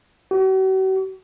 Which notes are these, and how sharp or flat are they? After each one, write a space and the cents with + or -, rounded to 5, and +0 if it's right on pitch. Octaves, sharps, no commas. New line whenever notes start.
F#4 +45